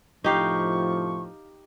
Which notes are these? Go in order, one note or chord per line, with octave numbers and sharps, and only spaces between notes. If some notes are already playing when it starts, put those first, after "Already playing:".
A2 C3 F3 D#4 G4 F5 C#6